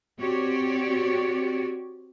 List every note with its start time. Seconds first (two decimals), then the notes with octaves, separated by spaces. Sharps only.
0.19 C4 F#4 G4 C#5 D5